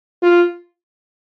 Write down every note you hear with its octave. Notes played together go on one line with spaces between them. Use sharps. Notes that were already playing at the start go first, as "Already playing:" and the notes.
F4